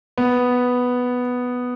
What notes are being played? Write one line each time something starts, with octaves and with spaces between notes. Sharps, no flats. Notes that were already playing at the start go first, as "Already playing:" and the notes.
B3